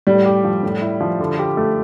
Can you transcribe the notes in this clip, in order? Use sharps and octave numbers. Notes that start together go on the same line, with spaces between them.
A2 G3
G4
F3
A2
E4
F3
D3
G4
A3